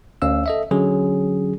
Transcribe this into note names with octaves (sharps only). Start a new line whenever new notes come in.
D2 C#4 F5 E6
A4 D#5 E5
D3 F#3 C#4 G#4